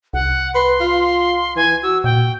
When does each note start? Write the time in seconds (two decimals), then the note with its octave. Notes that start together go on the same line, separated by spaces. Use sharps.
0.13 C2 F#5
0.55 B4 C6
0.80 F4
1.56 E3 G#5
1.83 F#4 E6
2.04 A#2 G5